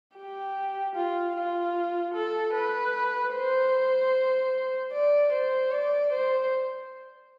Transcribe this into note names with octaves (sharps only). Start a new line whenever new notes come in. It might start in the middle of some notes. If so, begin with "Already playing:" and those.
G4
F4
F4
A4
B4
C5
D5
C5
D5
C5